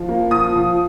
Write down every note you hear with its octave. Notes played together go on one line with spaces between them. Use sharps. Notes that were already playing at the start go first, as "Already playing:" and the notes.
Already playing: F3
A#3
F3 D#6
F3